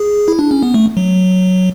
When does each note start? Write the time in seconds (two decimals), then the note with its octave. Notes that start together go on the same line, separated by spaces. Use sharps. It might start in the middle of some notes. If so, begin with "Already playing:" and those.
Already playing: G#4
0.28 E4
0.39 D4
0.51 C#4
0.63 B3
0.74 A3
0.97 F#3